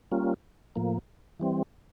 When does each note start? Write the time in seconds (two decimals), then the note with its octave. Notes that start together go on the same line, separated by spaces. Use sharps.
0.11 G3 A#3 C#4 F4
0.76 A2 F3 A#3
1.40 E3 G3 C4